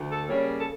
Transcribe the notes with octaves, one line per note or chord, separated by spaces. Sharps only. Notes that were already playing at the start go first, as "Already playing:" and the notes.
Already playing: D2
A4
C#3 G3 A#3 C#5
A4